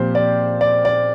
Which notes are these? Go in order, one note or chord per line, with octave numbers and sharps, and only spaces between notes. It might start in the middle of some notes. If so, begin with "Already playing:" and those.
Already playing: A#2 F3 C4 G4 C5
D5
D5
D5